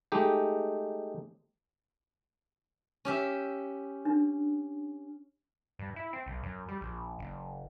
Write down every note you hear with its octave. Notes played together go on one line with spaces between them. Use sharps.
G#3 A3 D#4 G4
C#4 G4 E5
D4
G2
E4
C4
B1
F#2
G3
A#1
F#1